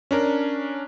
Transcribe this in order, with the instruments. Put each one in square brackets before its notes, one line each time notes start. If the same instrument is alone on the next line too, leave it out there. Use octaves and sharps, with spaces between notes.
[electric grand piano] C#4 D4 A#4